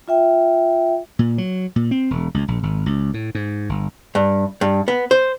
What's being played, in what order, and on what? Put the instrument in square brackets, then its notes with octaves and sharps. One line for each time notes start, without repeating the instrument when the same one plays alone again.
[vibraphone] F4 E5 G5
[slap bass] A#2
F#3
A#2
C4
E1
C#2
A#1
G#1
C#2
A2
G#2
G1
[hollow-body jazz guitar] G2
G2
B3
C5